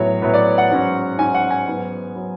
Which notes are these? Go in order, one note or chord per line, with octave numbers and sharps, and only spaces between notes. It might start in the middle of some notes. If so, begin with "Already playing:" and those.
Already playing: A2 F#3 B3 C#5
A2 F#3 B3
D5
F#5
G#2 F#3 C#4
G#2 F#3 C#4 G#5
F#5
G#5
G#2 F#3 B3
F#3 B3